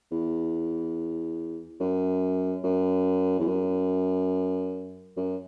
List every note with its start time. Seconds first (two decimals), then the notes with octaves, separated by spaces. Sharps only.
0.12 E2
1.80 F#2
2.64 F#2
3.39 E2
3.48 F#2
5.17 F#2